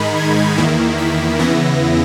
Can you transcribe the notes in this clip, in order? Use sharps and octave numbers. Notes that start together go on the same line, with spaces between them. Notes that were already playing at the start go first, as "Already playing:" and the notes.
Already playing: G#2 D#3 G#3 D#4 B5
G#6
E2 D#3 A#3 E4
B6
E2 C#3 E3 B3 E4 A#6